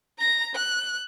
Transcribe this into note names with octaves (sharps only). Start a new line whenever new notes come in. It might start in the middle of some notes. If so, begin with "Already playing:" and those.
A#5 A#6
F#6